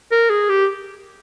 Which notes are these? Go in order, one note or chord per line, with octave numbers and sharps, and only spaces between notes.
A#4
G#4
G4